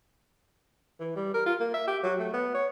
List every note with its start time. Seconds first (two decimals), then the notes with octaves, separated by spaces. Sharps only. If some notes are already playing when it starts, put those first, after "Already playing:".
1.00 E3
1.16 G3
1.34 A#4
1.46 F4
1.60 A#3
1.74 E5
1.87 G4
2.03 F#3
2.19 A3
2.33 B3
2.54 C#5